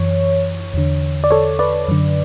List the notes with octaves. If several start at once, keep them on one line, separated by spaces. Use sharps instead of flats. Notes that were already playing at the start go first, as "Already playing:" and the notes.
Already playing: F#2 E3 C#5
E2 D3
D5
A4 C#5
B4 D5
F#2 D3